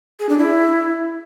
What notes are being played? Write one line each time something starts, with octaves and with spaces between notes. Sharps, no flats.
G#4
D4
E4